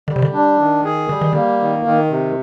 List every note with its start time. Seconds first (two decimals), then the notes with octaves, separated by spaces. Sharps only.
0.08 D3 G3
0.16 C3
0.22 D3
0.33 D4
0.59 D#3
0.84 G#4
1.09 D3 G3
1.21 D#3
1.33 D3 A#3
1.60 D#3
1.86 D#3
2.11 C3